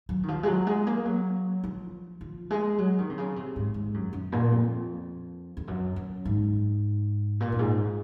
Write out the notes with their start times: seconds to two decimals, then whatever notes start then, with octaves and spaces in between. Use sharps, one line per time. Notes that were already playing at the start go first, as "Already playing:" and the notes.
0.09 F#3
0.23 D#3
0.28 F3
0.43 G#3
0.47 F#3
0.67 G#3
0.87 A#3
1.05 F#3
1.64 F3
2.21 F3
2.50 G#3
2.78 F#3
2.99 D#3
3.10 C3
3.18 C#3
3.36 C3
3.56 G#2
3.74 G#2
3.94 F#2
4.13 F#2
4.32 A#2
4.52 F2
5.57 F2
5.68 F#2
5.96 F#2
6.25 G#2
7.40 A#2
7.52 F#2
7.59 G#2